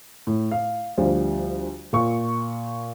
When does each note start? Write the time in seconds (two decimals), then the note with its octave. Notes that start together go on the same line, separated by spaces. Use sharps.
0.27 A2
0.51 F5
0.98 D2 F3 G3
1.93 A#2 C#6